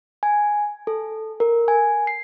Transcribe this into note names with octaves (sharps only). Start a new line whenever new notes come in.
G#5
A4
A#4
G#5
C7